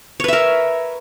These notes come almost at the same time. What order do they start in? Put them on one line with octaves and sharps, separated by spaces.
C#5 B4 E5 A#4